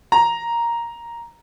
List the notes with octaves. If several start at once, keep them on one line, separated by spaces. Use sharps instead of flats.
A#5